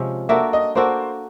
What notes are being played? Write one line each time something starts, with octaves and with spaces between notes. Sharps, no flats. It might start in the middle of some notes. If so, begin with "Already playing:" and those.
Already playing: C3 F3 G#3 C#4
A#3 D4 F#4 A4 E5
D#5
A#3 D4 F#4 A4 C5